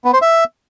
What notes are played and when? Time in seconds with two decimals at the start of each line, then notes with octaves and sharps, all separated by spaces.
0.05 B3
0.13 C5
0.22 E5